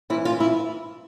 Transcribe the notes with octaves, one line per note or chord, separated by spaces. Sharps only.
G#2 E3 E4
F4
E4